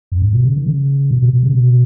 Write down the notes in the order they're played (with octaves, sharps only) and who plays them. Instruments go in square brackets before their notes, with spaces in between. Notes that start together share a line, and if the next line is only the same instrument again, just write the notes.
[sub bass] F#2
G#2
B2
C#3
D#3
C#3
B2
B2
B2
C#3
B2